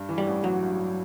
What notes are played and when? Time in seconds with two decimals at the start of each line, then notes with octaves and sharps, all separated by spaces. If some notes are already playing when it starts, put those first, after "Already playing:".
Already playing: G2
0.09 E3
0.18 G3
0.27 A1
0.44 A1 F#3
0.62 G2
0.79 G2